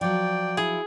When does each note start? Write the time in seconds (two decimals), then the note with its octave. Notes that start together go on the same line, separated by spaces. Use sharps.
0.01 F3 F#3 D5 G5
0.57 E4 G#4